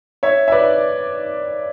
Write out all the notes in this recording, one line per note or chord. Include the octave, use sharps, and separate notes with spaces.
C#5 E5
E5
B4 D5